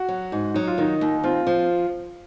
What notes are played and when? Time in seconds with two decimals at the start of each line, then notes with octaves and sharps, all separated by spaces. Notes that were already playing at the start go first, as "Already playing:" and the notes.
Already playing: F#4
0.08 F#3
0.32 G#2
0.54 F#3 D#4
0.67 F4
0.78 D#3 D#4
1.01 D#2
1.24 C4 F4
1.47 F3